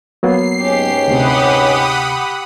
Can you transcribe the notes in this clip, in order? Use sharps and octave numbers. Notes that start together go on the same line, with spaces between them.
F#3 A#3 B3 C7
C#2 G#2 C#4 G4
D2 C3 F#5 B5 D#6